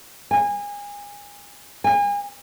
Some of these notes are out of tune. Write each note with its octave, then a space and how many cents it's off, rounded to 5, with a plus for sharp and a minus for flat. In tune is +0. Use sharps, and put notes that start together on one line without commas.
G#5 -25
G#5 -35